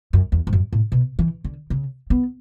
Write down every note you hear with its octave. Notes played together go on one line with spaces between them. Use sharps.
F#2
E2
G#2
F#2
A2
B2
E3
D3
C#3
B3